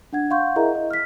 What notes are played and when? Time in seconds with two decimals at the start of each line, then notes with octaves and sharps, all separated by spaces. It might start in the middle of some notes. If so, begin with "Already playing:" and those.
0.13 D4 F#5 G#6
0.31 F5 F#5 C6 C#6 G6
0.56 E4 G#4 A#4 D#5 E5 A#5
0.75 D#5
0.91 F6 B6